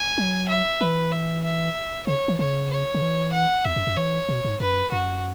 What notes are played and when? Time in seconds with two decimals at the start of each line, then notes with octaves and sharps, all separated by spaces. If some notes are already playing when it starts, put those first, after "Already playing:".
Already playing: G#5
0.18 F#3
0.49 E5
0.81 E3 B4
1.12 E5
1.44 E5
2.07 C#3 C#5
2.28 E3
2.39 C#3 C#5
2.70 C#5
2.94 C#3
3.02 E3
3.33 F#5
3.65 E2 E5
3.76 F#2
3.87 F#2
3.97 E3 C#5
4.29 B2
4.45 G#2
4.60 F#2 B4
4.91 F#2 F#4